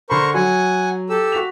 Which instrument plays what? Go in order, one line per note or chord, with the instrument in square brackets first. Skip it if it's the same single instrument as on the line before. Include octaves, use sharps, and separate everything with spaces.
[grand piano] D3 B5 [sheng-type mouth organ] A#4 C5 C#6
[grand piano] F#3 [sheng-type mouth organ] F#5 G#5
[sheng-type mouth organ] G4 A4 E6
[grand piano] F#4 B6 F7